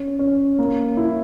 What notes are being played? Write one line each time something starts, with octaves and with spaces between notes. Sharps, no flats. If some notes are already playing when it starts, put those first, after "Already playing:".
Already playing: C#4
C#4
A#3
E4